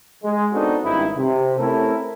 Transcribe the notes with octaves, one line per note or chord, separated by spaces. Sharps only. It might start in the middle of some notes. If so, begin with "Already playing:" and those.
G#3
B3 C4 D4 D#4 F#4 A4
G#1 G2 C#4 D#4 E4
C3
A3 C4 C#4 E4 A4 A#4